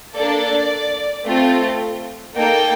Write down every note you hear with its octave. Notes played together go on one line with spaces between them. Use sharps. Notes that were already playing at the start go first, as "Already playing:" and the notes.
A#3 D4 A4 D5
A3 C4 F4 A4
A#3 D#4 A4 G5